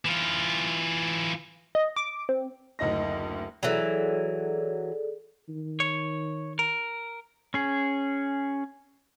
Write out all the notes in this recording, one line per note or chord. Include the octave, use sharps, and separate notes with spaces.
E3 F4
D#5
D6
C4
F#1 D2 D#4 D#5 A#6
E3 F#3 G#4 A4 D5
D#3
C#5
A#4
C#4 G#4